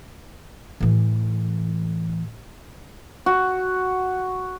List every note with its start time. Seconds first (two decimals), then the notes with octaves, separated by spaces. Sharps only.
0.80 A2 E3
3.26 F#4